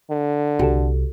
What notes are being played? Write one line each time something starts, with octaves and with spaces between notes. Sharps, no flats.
D3
C2 F#4 G4 A4